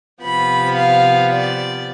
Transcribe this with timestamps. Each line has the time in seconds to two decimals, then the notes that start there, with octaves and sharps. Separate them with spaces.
0.23 C3 F3 B3 B5
0.77 F5
1.32 D5